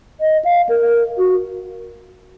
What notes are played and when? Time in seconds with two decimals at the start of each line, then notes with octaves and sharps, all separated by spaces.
0.21 D#5
0.45 F5
0.69 A#4
1.18 F#4